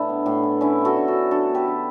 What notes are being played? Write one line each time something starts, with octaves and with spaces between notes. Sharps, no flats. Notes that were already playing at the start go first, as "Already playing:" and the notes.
Already playing: A2 E3 D4 E4
B3
A2
E3
D3 C#4 E4
B3
F#4 A4
D3
F#4 A4
F#3
D3 F#4 A4
B3
G4 B4
D3